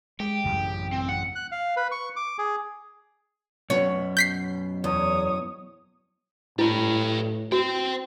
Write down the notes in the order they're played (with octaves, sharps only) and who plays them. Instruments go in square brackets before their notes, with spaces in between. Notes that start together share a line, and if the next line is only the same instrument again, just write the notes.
[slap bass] G#3 [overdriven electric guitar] G4
[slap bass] A1 F#2 C#3
[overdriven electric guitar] C4
F#5
[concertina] F#6
F5
B4
C#6
D6
G#4
[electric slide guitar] F#2 B2 B3 [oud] C#5
[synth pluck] G6 B6 C7
[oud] E2 [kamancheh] C#5 D#6
[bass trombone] A2 [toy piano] E4 [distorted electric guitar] G4 B4
[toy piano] F#4 [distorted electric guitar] C5 G5